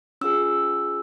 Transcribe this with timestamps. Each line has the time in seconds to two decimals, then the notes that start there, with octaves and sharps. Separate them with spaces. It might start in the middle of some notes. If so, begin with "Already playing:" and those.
0.21 C#4 F4 G#4 E6